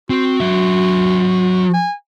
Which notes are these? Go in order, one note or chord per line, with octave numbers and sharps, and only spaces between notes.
C4 F#4
F#3 E5
G#5